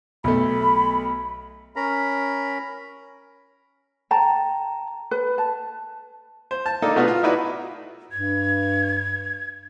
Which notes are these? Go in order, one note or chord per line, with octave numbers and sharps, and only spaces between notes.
B1 A3 B5
C#4 A#4 A#5 B5
G5 A5 A#5
B4
A5
C5
A5
A#3 D4 D#4 A4
B2 A3 B3 D4 D#4 F4
F4
D#4 E4 F#4 B4 D5
G2 G#6